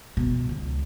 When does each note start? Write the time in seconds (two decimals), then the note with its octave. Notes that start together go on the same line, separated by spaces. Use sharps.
0.17 B2
0.49 C#2